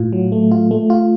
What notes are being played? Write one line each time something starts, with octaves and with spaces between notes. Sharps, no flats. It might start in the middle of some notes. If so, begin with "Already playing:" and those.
Already playing: A2 F4
F#3
A3
F4
A3
F4